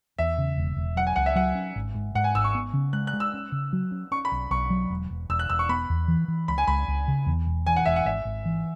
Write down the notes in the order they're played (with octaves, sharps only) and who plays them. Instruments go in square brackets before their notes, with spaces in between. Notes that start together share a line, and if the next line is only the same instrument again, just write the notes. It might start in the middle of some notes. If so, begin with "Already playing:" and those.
[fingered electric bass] E2 [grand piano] E5
[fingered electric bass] C#3
E1
E1
[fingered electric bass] F#3 [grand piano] F#5
[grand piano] G#5
[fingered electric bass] C#2 [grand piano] F#5
[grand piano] E5
[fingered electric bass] F#3 [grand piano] F#5
[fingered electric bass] C#4
G#1
G#2
[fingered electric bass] G#2 [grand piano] F#5
[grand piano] G#5
[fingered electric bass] G#1 [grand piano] E6
[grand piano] C#6
[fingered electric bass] B3
C#3
[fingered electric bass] G#3 [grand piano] F#6
[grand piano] F#6
[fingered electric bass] G#3
[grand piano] E6
[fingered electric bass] C#4
C#3
F#3
C#4
[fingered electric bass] C#4 [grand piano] C#6
[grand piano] B5
[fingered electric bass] B1
[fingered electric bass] B1 [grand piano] C#6
[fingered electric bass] F#3
E1
E1
[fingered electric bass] E1 [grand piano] E6
[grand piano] F#6
[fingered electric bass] E1 [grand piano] E6
[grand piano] C#6
[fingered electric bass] B3 [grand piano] B5
[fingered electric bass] E2
E3
E3
[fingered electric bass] C#2 [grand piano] B5
[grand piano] G#5
[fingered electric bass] C#2 [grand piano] B5
[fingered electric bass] C#2
C#3
E2
E1
[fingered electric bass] E3 [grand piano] G#5
[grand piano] F#5
[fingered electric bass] E1 [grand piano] E5
[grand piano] F#5
[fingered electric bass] G#1 [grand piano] E5
[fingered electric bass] G#1
E3